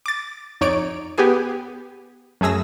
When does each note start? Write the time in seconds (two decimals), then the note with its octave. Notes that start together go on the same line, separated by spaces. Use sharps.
0.06 D6 A6
0.61 F2 D#4 C#5 D5 D7
1.18 B3 G4 G#4 G#5
2.41 F#2 A3 G#4 E6 A#6